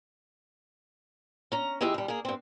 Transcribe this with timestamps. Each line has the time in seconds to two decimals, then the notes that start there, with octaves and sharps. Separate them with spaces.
1.52 C#4 A#5
1.81 F2 E3 G4 G#4 D#5 E5
1.94 D#2 G3
2.08 A#3 G#4
2.25 G2 C4